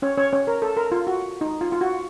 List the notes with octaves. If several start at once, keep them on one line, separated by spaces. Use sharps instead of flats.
C#4 C#5
C#4 C#5
C#4 C#5
A#4
A4
A#4
F4
F#4
D#4
F4
F4
F#4